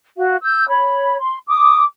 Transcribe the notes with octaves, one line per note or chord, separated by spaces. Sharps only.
F#4 F5
E6 G6
C#5 B5
C6
D6 D#6